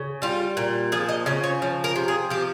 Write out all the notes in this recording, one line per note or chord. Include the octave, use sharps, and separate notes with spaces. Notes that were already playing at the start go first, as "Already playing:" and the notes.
Already playing: C#3
G3 F4
A#2
F3 G#4
D#5
C#3 C#5
C#5
F3
A#4
C3
G#4
F3 G4